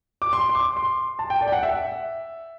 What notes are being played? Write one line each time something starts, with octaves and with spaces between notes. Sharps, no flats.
D6
C6
C6
D6
C6
A5
G5
D5
G5
F#5
E5